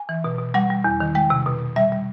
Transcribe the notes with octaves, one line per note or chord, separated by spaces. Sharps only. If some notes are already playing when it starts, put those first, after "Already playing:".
Already playing: G#5
E3
B2
B2
G3 F#5
G3
E2
D#3
G#3 G5
C3
B2
B2
G3 E5
G3